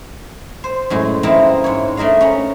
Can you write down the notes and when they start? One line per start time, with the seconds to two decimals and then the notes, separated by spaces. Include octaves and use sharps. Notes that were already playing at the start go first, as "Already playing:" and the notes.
0.64 C5
0.90 F#2 A2 G#3
1.23 A#3 C4 D#4 E4 A#4 B4
1.64 G#2 C#5
1.97 A3 D4 A#4 D#5 F5
2.21 C#4 A#5 B5